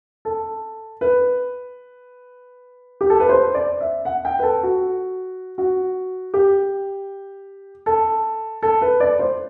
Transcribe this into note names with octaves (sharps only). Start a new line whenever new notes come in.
A4
B4
G4
A4
B4
C5
D5
E5
F#5
G5
B4
A4
F#4
F#4
G4
A4
A4
B4
D5
C5